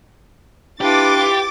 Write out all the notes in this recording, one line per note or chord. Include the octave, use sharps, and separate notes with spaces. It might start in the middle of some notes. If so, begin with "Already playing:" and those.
D4 E4 F4 G4 B4 D6 A6